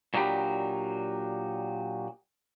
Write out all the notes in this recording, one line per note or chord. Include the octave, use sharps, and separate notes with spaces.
A#2 F#3 D4 D#4 G4 B5